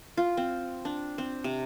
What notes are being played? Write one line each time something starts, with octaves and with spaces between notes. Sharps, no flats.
F4
C4
D4
C4
C3